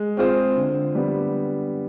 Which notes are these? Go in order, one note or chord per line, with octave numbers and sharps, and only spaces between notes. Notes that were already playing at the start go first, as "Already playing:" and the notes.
Already playing: G#3
C4 F4 G#4 C5
D3
G3 B3